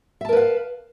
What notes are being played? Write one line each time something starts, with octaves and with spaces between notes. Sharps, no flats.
A#4 B4 E5 F5 A5